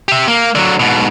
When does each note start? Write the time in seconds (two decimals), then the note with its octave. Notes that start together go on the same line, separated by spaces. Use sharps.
0.08 G4 E5
0.28 A#3
0.55 D3 F#3
0.80 G#2 B2